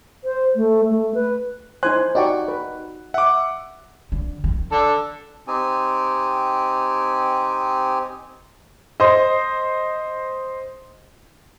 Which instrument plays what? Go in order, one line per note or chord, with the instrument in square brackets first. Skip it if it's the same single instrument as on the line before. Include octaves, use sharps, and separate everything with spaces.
[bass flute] C5
A3
A3
B4
[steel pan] D#4 E4 G#5 [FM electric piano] C5 [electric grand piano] F#6
[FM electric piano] D#4 F#4 [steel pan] D5 G5 C#6
[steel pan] B4
[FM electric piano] E5 [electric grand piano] F#5 D6
[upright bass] D3
D#3
[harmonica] D4 A4
[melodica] C4 D#4 G4 G#5
[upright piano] C5 D#5